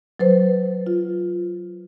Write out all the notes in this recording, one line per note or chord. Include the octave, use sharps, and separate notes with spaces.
F#3 B4 C5
F4